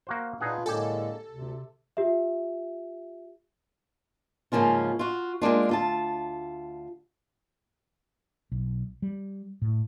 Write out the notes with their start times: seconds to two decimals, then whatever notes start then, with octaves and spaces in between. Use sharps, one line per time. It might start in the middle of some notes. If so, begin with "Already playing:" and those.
0.07 A#3 F#4 C5
0.41 A#2 D4 D#4 F4 G#4 B4 F#5
0.66 A2 D3 G#3 A#3 G4 A4 G5 G#5
1.30 D2 C3
1.97 F4 G4 E5
4.52 G#2 C#3 F3 A#3 C#4 F4
4.99 F4 F#4
5.42 G#3 A#3 D4 F4
5.69 D2 F4 A5
8.52 B1
9.02 G3
9.62 A2